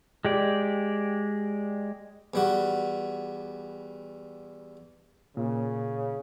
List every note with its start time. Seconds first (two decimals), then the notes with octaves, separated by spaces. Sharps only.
0.25 G#3 G4 D5
2.34 E2 G3 F#4
5.37 A#2 C#3